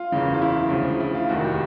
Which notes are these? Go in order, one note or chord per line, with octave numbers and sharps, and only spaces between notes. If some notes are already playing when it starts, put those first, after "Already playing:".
Already playing: F4
F#1 E2 C#3 E3
F4
E4
D2 C#3 F3
E4
F4
F1 D#2 D#3 F#4
G4